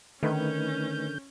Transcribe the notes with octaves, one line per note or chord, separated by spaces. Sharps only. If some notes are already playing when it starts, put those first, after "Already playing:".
D3 D#3 A3 C#4 D#4 B4 G6